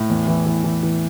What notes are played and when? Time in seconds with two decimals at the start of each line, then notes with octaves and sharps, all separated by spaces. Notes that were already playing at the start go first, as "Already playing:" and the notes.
Already playing: A2
0.10 E2
0.28 E3
0.46 E3
0.64 E3
0.83 E3